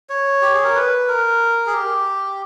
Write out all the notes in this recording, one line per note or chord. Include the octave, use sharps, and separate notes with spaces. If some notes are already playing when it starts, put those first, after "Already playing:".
C#5
G4
G#4
A#4
B4
A#4
G#4
G4